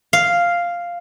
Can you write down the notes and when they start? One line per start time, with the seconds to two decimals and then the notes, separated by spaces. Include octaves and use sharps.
0.13 F5